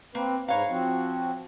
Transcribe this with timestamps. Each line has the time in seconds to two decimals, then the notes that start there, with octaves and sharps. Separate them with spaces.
0.15 A#3 C4 B4
0.48 G#2 B4 C#5 F5 A#5
0.70 F3 C4 F#4